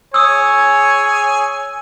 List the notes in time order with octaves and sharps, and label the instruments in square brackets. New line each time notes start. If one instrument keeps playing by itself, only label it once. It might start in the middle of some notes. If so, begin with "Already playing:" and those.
[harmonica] G#4 G#5 [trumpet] C#5 [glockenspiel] D#6 E6